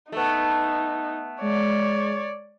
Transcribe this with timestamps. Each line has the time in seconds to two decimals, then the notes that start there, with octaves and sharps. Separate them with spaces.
0.12 A3 B3 D#4
1.41 G#3 C#5 D5